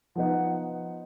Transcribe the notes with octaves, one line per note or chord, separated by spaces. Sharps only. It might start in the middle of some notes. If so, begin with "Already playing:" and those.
F3 B3 D#4 F#5